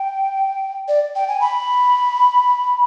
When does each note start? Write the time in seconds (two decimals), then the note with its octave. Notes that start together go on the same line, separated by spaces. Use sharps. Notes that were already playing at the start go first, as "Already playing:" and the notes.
Already playing: G5
0.88 D5
1.15 G5
1.28 G#5
1.41 B5